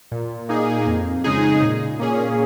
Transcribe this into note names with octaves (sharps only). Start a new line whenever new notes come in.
A#2
A#3 D#4 G#4
F2
C#3 G#3 D#4 G#4
A#2
A#3 C#4 G#4